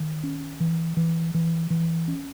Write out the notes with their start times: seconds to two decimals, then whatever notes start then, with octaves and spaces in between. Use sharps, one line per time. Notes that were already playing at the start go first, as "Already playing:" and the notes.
Already playing: D#3
0.24 C#4
0.60 E3
0.97 E3
1.34 E3
1.70 E3
2.08 C#4